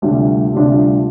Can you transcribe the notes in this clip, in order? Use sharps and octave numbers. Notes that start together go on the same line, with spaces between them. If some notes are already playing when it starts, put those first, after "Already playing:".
D2 C3 G3 D4 F4
D2 C3 G3 D4 F4